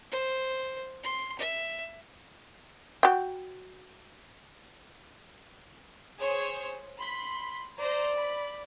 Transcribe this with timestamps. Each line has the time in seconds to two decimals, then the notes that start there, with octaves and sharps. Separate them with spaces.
0.12 C5
1.04 C6
1.39 E5
3.03 F#4 G5
6.20 G#4 C5 C#5
6.98 B5 C6 B6
7.79 C5 D5 A#5
8.17 B5